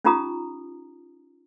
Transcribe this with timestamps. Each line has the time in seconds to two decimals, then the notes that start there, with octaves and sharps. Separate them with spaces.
0.04 C#4 D#4 F4 G4 A#5 D#6